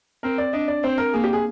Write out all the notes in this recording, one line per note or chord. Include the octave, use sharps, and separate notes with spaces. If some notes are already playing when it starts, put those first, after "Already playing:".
C4 A#4
D5
D4 D#5
D5
C4 C5
A#4
A#3 G#4
G4
G#4